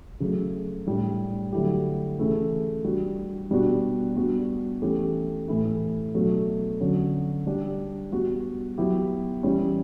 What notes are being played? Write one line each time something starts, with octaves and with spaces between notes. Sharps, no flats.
C#3 F#3 A3
A2 G3 D4 G4
D3 F#3 A3 E4 G4
C#3 E3 A3 E4
G3 D4 F#4
B2 G3 B3 D4 F#4
G3 B3 D4 F#4
E3 A3 C#4 G4
A2 E3 A3 E4
B2 F#3 A3 D4 F#4
D3 F#3 C#4
G3 D4 G4
G3 B3 F#4
F#3 B3 E4 G4
E3 G3 C#4